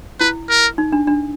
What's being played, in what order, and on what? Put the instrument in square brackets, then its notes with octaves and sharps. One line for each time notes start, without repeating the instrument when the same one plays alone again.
[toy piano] E4 [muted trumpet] B4
[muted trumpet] A#4
[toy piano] D#4
D4
D4